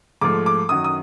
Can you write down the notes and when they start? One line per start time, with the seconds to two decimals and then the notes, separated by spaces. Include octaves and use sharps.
0.21 G#2 F3 A3 D6
0.46 D6
0.69 F#2 D#3 F#3 D#6
0.84 D#6